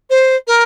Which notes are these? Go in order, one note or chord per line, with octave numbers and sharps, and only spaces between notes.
C5
A#4